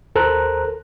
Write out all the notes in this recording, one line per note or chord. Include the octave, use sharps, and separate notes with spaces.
D#2 A4 A#4 C5 A#5 F#6